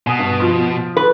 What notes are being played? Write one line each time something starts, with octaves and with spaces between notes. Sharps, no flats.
B2 G#5 D#6
G2
F3
B4